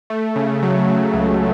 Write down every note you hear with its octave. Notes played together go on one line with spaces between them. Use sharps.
A3
C#3
F#3
F#3
C#2